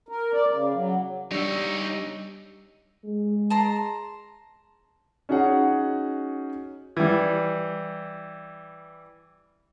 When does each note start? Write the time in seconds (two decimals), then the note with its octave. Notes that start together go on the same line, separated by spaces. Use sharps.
0.09 A#4
0.33 D5
0.51 C#3
0.74 F#3
1.31 G3 D4 D#4 G4 C#5 C#6 E6
3.05 G#3
3.50 A5 A#5 C6
5.29 C#4 D#4 F#4 G#4 F#5
6.97 E3 G3